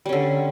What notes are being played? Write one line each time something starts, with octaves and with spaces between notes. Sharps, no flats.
D3 G3 C#4